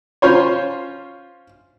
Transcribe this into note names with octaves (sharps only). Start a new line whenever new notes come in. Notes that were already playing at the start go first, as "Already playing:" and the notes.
C#4 F4 C5 C#5